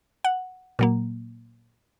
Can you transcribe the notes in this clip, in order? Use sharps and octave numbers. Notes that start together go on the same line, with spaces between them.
F#5
A#2 F#3 A#3